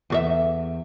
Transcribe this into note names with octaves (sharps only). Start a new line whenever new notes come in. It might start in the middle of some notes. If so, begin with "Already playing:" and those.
E2 F#4 E5